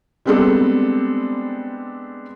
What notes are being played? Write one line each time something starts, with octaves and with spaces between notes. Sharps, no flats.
G3 G#3 B3 C4 D4 A4